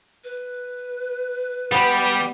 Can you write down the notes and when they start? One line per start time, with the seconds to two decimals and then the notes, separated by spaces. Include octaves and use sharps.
0.24 B4
1.72 G3 B3